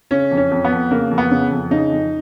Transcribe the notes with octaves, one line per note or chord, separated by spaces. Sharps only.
C#3 C#4
F2
C#4
F2
B3
F2
C#3 A#3
F2
B3
C#3
F2
C#3 D#4
F2